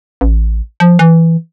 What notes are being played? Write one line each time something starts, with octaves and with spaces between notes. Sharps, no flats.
A1
F3
E3